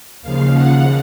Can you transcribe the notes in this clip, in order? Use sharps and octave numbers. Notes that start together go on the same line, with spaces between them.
D#2 C#3 F3 F5
F#5